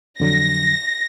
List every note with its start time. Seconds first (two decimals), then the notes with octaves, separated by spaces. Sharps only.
0.20 F2 D3 F#3 A#6